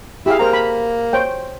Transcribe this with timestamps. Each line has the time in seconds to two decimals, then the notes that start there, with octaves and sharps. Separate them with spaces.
0.26 E4 G4 G#4 F5
0.39 A#3 A#4 C5 A#5
0.53 B5
1.13 C5 C#5 G5